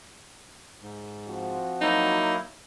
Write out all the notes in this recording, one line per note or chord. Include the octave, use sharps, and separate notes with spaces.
G#2
F3 C4 F#4
F#3 A#3 D#4 E4